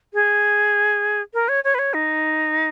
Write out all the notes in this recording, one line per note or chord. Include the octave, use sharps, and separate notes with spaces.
G#4
A#4
C#5
C#5
B4
C#5
D#4